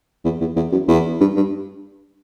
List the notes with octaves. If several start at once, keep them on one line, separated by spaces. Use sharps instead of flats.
E2
E2
E2
F#2
E2
G2
G2